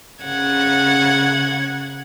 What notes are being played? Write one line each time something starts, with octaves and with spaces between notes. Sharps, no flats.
C#3 F#5 G#6